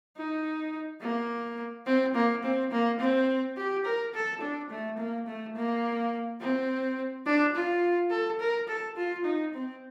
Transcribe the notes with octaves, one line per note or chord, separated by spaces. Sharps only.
D#4
A#3
C4
A#3
C4
A#3
C4
G4
A#4
A4
D4
A3
A#3
A3
A#3
C4
D4
F4
A4
A#4
A4
F4
D#4
C4